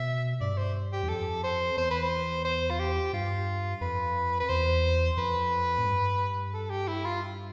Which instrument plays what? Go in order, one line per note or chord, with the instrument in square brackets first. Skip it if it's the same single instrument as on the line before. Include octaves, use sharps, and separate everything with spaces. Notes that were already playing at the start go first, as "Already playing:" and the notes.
Already playing: [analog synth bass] B2 [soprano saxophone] E5
[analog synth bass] G2 [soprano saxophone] D5
[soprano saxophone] C5
G4
[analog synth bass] E2
[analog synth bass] F2 [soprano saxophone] A4
[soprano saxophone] C5
[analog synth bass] E2 [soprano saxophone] C5
[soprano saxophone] B4
C5
C5
F4
G4
[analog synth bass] G2 [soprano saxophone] F4
[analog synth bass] F2 [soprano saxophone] B4
[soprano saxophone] B4
[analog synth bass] E2 [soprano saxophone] C5
[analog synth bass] F2 [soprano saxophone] B4
[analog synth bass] A2
G2
[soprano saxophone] A4
G4
E4
F4